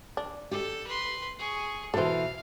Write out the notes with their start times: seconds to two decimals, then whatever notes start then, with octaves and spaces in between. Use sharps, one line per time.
0.17 D4
0.51 G4 A4
0.87 B4 C6
1.39 G#4 C#6
1.94 B2 E3 A4 C5 F5